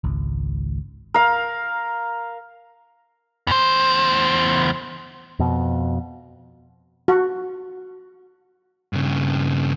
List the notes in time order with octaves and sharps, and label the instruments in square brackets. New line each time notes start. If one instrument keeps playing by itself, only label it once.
[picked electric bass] G#1 C#2
[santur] A#4 F5
[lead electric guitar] E2 C5
[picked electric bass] F2 B2
[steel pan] F#4
[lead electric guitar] G2 C#3